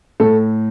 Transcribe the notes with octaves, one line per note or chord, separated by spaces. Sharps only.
A2 A4